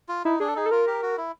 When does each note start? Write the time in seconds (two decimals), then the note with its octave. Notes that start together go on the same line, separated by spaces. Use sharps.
0.09 F4
0.25 D#4 E4
0.40 D4 G#4
0.49 A4
0.56 D#4 G#4
0.66 A4
0.71 F4 A#4
0.87 G4
1.02 F#4
1.18 E4